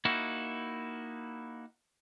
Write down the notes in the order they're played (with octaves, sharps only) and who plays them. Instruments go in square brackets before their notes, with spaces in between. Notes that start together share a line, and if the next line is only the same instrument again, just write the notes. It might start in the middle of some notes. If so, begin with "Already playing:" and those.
[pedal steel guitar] A#3 D#4 E4 F#4